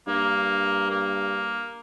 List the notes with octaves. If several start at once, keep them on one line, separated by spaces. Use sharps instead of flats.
G2 A#3
A#3